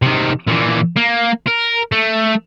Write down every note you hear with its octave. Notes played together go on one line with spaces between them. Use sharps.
C3 D#3
A#2 E3
A#3
A#4
A3